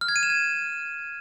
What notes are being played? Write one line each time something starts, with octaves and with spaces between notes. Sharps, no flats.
F6
G#6
D#7
E7
G#6